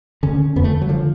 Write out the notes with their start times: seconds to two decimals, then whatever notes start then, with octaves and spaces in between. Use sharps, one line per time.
0.23 D2 D3 C#4
0.56 F2 D3 B3
0.64 A3
0.82 F#3
0.89 D3 F3